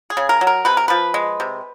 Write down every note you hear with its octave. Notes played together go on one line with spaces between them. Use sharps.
G#4
C#3
A#4
F#3
A#4
C3 B4
A#4
F3 B4
G#3
C3